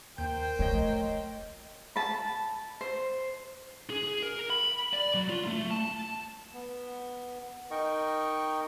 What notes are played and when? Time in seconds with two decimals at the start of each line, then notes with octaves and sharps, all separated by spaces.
0.18 D#2 A#4 C5 G5 G6
0.59 A3 C#5 D#5
1.96 A5 B5
2.81 C5
3.90 G#4
4.23 A#4
4.50 B5
4.93 D5
5.14 F#3
5.29 F4
5.47 A3
5.71 A5
6.54 B3
7.71 D#4 A#4 D#5 G5 C#6